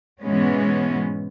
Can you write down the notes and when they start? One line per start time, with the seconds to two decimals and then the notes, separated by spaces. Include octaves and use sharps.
0.22 G#2 B2 E3 G#3 B3 C#4